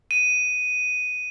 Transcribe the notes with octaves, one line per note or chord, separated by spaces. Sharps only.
D#7